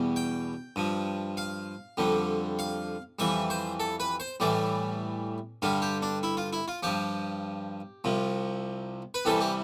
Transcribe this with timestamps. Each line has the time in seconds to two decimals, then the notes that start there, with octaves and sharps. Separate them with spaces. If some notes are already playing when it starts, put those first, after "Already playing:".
Already playing: E2 B2 G3
0.16 G5
0.76 G2 F3
1.37 F5
1.97 F2 D3 G3
2.59 F5
3.19 F2 E3 G3 E5
3.50 C5
3.80 A4
4.00 B4
4.20 C5
4.40 A2 E3 G3 D5
5.62 G2 D3 G3 F5
5.82 G4
6.02 D4
6.23 E4
6.37 F4
6.53 E4
6.68 F4
6.83 G2 F3 G4
8.04 C2 C3 F3
9.14 B4
9.25 C2 C3 E3 G3 A4
9.41 G4